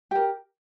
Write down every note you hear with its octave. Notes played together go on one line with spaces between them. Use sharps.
G4 A#4 G5